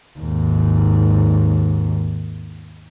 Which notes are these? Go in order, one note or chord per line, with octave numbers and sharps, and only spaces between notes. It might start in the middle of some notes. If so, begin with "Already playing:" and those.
D#2 G#2